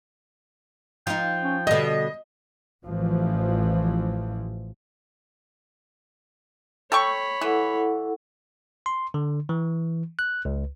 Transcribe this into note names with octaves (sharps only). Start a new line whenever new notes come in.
F3 D#4 G5
C#4
B2 D3 G3 D#5
A1 E3 F3
A4 C#5 G5 B5 C#6
E3 E4 A4 F#5
C6
D3
E3
F#6
C#2